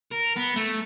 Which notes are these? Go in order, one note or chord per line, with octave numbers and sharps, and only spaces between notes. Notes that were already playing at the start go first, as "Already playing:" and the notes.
A#4
B3
A3